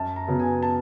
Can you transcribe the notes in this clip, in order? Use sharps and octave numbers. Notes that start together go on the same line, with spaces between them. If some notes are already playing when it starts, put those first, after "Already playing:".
Already playing: F#2 A5
A#5
C#3 F#3 B3
G#5
A5